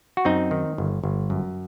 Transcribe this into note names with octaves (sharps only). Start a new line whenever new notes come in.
F#4
F#2 C4 D#4
D#3
G1
G1
F#2